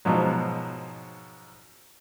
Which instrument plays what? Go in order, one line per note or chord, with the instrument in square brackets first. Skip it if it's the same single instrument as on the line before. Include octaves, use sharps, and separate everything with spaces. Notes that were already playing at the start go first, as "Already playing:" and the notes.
[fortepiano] G#2 B2 F3 F#3